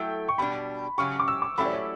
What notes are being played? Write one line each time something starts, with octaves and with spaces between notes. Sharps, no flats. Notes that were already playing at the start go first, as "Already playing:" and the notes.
Already playing: F#3 A3 E4 A4 G5
C#6
B2 G3 D4 G4 B5
C#3 F#3 C#4 G4 C#6
D6
E6
D6
F#3 A3 C#4 E4 G4 B5
D5
C#5